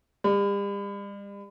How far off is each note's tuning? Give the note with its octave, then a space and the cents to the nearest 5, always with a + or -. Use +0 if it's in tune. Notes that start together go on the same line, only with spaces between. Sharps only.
G3 +40